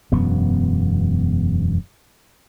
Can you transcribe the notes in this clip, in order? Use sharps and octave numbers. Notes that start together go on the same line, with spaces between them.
E1 F#2 F#3 B3